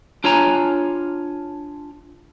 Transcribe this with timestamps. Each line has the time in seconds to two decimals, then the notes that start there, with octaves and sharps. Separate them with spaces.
0.24 D4 F4 C#5 G#5 A#5